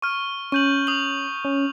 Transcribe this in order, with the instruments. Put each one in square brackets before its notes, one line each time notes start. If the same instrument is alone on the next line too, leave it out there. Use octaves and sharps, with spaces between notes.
[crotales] C#6 F6
[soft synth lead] C#4 [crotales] C#6 G6 F#7
[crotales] D#6 F#7
[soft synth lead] C#4